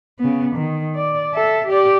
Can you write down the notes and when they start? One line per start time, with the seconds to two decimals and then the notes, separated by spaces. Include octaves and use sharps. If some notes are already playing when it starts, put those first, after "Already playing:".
0.19 C#3 B3
0.56 D#3
0.95 D5
1.33 A4 E5
1.68 G4 D5